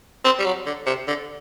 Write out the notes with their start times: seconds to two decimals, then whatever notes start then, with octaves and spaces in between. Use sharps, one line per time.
0.25 C4
0.39 G3
0.45 F#3
0.66 D3
0.86 C3
1.07 D3